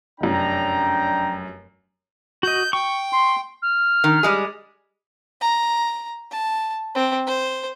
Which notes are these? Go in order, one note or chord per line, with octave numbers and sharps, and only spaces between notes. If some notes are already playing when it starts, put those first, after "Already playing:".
F1 F#2 D4 G5 A#5
F#4 D#5 G6
G5 C#6
C6
F6
D#3
G3 G#3 G#4
A#5
A5
C4
C5